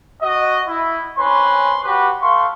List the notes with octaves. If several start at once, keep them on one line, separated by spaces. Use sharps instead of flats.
F#4 D#5
E4
C4 C#4 B4 C6
F#4 G4 B4
A3 F5 C6 C#6